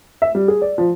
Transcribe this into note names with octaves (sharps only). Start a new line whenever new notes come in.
E5
G3
G#4
D5
F3